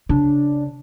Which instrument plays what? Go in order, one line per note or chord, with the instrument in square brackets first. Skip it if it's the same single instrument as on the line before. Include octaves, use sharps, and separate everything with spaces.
[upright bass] C#3 [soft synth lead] D4